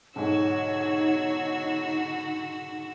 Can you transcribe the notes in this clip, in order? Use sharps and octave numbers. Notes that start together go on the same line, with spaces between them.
B1 G#2 D3 D#4 F#4 C#5 E6